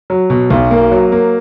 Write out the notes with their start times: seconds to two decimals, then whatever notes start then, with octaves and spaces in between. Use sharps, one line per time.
0.10 F#3
0.30 B2
0.50 B1
0.71 A#3
0.92 F#3
1.12 A#3